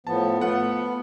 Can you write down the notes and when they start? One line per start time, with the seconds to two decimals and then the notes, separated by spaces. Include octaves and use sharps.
0.07 A2 F3 B3 A5
0.41 A3 B3 F4 F#5